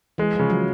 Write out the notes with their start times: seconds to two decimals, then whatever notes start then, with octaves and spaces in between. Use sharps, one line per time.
0.18 E3 G#3
0.35 F3
0.39 C#3
0.50 F#3